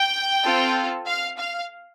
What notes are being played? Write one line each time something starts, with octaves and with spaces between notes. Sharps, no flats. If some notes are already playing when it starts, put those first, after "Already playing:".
Already playing: G5
C4 F4 A4
F5
F5